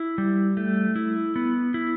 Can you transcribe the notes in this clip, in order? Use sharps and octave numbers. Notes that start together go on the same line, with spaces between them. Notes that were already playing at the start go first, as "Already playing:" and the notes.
Already playing: E4
G3
A3
E4
B3
E4